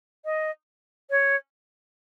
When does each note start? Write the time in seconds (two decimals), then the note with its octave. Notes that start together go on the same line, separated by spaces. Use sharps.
0.25 D#5
1.10 C#5